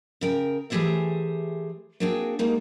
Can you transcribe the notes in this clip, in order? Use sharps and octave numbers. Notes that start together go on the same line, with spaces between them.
C#3 A#4 G5
E3 A3 G4 G#4 C5 E5
A#3 C4 D4 F#4 G#4 G5
G3 G#3 A#3 D#4